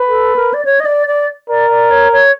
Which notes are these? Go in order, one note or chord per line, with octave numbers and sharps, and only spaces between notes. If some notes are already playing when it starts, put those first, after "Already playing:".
Already playing: B4
A4
A#4
D5
C#5
D#5
D5
D5
A#4 D5
D5
C#5
C#5